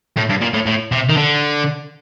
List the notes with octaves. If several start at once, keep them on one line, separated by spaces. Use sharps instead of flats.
A2
G2
A#2
A2
A2
C3
D#3
D3